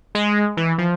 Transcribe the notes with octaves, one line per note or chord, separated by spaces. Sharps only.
G#3
E3
F3